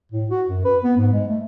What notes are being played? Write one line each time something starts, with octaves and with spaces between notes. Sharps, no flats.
A2
F#4
F#2
B4
B3
G#2
G#3
A3